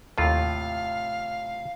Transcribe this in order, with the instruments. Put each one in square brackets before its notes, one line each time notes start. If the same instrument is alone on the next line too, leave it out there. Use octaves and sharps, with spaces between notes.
[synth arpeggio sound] D#2 A4 [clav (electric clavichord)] A2 C3 F4 [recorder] F5